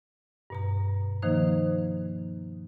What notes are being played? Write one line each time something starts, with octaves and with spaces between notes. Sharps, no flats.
G2 B2 A#5
D#3 F3 A#3 D#4 C5